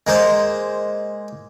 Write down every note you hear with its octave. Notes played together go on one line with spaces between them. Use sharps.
G#3 A#3 C5